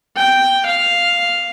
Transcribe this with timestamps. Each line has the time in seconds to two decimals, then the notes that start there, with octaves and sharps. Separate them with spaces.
0.17 G5
0.66 F5